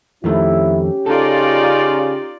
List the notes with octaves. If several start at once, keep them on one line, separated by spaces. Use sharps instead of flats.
F2 D#3 A3 C#4 E4 G4
C#3 D#4 F4 A4 D5